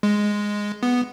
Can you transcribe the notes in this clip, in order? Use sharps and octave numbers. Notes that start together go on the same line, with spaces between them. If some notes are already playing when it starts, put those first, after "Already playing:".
G#3
B3